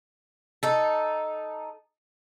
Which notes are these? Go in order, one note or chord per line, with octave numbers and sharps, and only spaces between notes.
D#4 A4